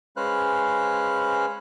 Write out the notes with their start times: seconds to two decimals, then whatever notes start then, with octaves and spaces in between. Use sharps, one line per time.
0.17 G#3 C#4 B4 C5 F5 F#6